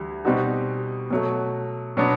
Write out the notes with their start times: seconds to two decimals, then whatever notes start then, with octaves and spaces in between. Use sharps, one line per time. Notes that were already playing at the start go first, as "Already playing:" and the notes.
Already playing: D2 E3 G3
0.25 B2 G3 C4 D#4 F#4
1.10 B2 F#3 A3
1.97 B2 F#3 B3 D4